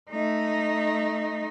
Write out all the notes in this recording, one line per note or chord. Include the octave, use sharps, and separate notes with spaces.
A3 D#4